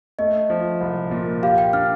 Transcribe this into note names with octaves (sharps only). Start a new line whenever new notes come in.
A3 D#5
F3
C2
A#2
G4 F5
G5
D4 F6